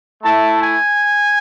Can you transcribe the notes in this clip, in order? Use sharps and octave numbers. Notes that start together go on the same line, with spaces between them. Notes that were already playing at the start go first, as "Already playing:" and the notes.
A3 E4 A5
G#5